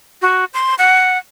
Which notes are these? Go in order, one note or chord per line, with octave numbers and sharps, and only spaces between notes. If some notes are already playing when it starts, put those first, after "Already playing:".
F#4
C6
F#5